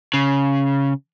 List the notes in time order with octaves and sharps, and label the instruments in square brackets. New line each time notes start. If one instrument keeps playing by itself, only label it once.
[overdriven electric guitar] C#3